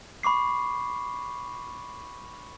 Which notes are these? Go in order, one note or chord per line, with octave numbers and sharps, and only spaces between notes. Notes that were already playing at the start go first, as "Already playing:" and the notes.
B5 C#6 D6 C7